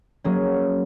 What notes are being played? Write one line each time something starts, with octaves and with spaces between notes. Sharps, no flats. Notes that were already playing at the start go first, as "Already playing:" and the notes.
F#3 A#3 C#4 G#4